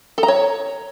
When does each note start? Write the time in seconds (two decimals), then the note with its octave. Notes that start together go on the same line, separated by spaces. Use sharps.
0.18 A4
0.23 A#5
0.28 C#5